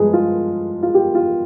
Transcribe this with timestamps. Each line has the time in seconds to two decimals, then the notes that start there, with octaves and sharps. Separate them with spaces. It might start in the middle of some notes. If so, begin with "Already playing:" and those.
Already playing: G2 F3 G#3 G#4 B4
0.13 F4
0.83 F4
0.94 G4
1.15 F4